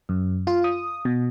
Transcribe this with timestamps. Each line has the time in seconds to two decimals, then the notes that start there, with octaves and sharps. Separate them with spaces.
0.09 F#2
0.47 F4
0.64 D#6
1.05 B2